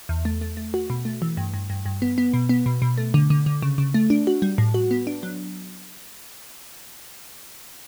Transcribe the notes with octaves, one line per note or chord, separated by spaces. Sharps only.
E2
A3
A3
A3
F#4
B2
A3
E3
G2
G2
G2
G2
B3
B3
B2
B3
B2
B2
A3
D3
D3
D3
C#3
C#3
A3
D4
F#4
G3
A2
F#4
B3
D4
F#3